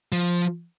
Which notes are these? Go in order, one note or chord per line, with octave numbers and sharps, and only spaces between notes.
F3